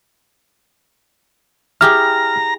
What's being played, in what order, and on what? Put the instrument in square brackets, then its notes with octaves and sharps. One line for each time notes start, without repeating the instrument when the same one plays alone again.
[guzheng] E4 G4 G#4 [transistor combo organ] A#5 [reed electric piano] F6